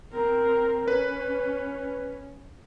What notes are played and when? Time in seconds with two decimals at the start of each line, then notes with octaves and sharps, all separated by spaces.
0.12 C4 A#4
0.88 C#4 B4